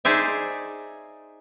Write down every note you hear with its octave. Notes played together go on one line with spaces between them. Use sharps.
D#4 G#4 C5 D5 E5